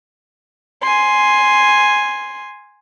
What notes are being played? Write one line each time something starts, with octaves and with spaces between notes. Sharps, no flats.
G#5 C6